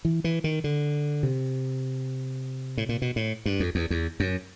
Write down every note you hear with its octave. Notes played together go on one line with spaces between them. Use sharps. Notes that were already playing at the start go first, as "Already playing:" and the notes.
E3
E3
D#3
D3
C3
A2
A#2
B2
A2
G2
F2
E2
E2
F#2